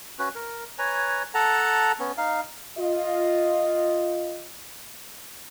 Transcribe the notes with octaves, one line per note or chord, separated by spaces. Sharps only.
C#4 F#4 B4
A#4
B4 C#5 G#5 A#5
A4 F#5 A5 A#5
B3 C#4
D#4 F5
F4 D#5